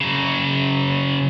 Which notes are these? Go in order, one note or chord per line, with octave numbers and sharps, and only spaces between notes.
C#3 F#3